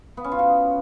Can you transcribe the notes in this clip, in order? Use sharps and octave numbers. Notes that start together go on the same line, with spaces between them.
B3
C#4
F4
F#4